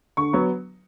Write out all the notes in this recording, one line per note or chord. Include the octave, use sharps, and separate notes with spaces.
D3 C#6
F#3 B3